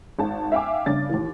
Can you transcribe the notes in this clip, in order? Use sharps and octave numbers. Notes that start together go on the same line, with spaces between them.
G#1 A5
E5 F5 G5 G#5 D6
G2 C#3 D4 A6
D#2 E3